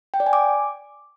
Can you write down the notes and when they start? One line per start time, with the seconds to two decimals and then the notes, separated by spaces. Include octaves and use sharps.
0.14 G5
0.20 D5
0.26 G#5
0.33 D6